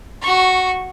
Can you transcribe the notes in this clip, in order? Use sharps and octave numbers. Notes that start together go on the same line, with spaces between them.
F#4 C#6